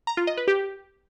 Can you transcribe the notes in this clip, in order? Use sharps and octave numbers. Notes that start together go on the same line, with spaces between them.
A#5
F4
D#5
B4
G4